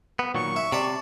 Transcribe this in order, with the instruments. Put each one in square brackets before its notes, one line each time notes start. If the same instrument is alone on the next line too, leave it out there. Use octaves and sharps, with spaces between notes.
[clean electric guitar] B3
[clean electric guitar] A#2 D#3 F#3 [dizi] C#6
[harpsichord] E5
[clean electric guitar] C3 [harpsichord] D5 A5 B5